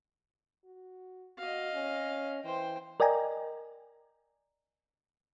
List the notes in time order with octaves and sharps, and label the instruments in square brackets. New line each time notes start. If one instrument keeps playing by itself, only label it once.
[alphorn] F#4
[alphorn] F#4 [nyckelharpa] D#5 F5
[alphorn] C#4
[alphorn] E3 [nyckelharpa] C5 G5
[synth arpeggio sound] A#4 D5 D#5 G5 G#5 A#5